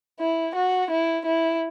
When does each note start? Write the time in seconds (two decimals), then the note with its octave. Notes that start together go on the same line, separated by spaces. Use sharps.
0.20 E4
0.55 F#4
0.91 E4
1.25 E4